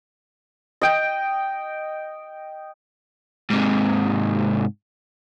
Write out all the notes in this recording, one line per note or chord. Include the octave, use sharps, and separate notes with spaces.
D#5 G5
G#2 C3